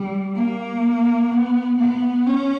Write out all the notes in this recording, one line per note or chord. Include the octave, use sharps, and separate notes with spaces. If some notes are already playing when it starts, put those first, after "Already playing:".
Already playing: G3
A#3
B3
B3
C#4